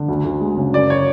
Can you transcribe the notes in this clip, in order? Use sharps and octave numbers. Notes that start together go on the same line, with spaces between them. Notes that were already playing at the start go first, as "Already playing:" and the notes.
Already playing: D3
D2
D2
G#3
C#3
F#2 D5
C#5